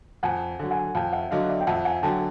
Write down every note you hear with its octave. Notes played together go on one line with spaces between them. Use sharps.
F2 F#5 G#5
D3 F#3
F#5 G#5
F2 F5 G5
E5 F#5
D3 F#3 D#5 F5
D5 E5
G5
F2 E5 F#5
F#5 G#5
D3 F#3 G5 A5